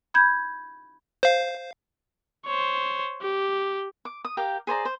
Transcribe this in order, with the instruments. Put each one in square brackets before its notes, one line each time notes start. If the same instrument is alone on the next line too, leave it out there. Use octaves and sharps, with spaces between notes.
[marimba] B5 G6 G#6
[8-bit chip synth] C5 F5
[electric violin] C5 C#5
G4
[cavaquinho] D6
D#6
G4 A#4 F5 G5
G#4 C5 D5 A#5
C5